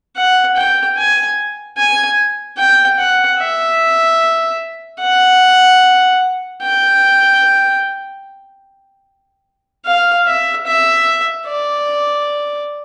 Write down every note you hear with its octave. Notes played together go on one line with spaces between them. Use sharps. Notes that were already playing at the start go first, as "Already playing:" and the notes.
F#5
G5
G#5
G#5
G5
F#5
E5
F#5
G5
F5
E5
E5
D5